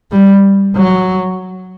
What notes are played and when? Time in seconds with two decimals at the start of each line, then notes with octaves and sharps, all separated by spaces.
0.11 G3
0.76 F#3